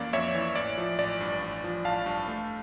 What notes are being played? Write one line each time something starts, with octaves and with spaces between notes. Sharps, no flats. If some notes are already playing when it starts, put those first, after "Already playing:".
Already playing: F2 E3 A#3 C#4 D5 F5
F2 C#5 E5
E3
A1 D5
F3
A1 D5
G2
A1
F3
A1 F5 A5
G2
A3